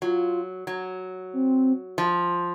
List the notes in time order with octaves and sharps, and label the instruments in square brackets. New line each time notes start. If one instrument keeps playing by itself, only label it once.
[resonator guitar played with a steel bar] F#3 [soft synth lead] F4
[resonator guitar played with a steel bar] F#3
[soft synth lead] C4
[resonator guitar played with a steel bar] F3